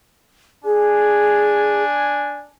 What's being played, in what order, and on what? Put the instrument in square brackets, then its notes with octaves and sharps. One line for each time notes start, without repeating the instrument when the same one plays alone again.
[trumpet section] D4 G#5 [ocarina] G#4